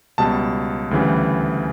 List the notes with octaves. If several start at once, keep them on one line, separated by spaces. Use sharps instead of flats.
C#2 B2 G3 A5
D2 C#3 E3 G3